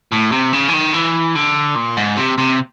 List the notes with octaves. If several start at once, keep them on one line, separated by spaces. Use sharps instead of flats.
A2
C3
C#3
E3
D#3
E3
D3
A#2
G#2
C3
C3